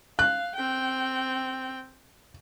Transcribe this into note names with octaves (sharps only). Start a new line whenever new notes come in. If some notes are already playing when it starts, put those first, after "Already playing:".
F5 F#6
C4 G5